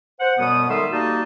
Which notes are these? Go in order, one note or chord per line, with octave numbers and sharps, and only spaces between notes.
C5 F#5
F#2 B2 G3 B3 D#6
D#3 G3 G#3 A4 E5 C6
G3 A#3 D#4 F#4 D#5 A5